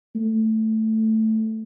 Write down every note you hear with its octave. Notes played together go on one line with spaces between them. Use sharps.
A3